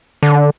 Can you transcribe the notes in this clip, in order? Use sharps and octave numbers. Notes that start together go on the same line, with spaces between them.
D3